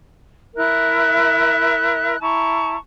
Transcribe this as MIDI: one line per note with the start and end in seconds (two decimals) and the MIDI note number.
0.55 2.16 64
0.55 2.16 70
0.55 2.16 76
0.55 2.16 90
2.20 2.75 64
2.20 2.75 81
2.20 2.75 82
2.20 2.75 85